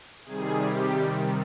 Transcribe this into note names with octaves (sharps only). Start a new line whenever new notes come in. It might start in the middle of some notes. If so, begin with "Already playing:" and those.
C3 D#3 G3 G#4
G4